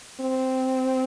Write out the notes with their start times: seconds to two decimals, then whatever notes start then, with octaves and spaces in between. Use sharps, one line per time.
0.21 C4